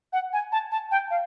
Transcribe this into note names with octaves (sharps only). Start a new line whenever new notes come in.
F#5
G#5
A5
A5
G5
F5